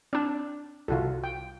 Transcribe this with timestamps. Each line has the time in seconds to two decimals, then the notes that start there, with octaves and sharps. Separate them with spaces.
0.13 C4 D4 D5
0.88 C2 C3 F4 F#4 A4
1.24 G5